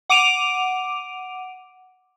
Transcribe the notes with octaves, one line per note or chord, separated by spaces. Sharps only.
F#5 D6 D7 D#7 F7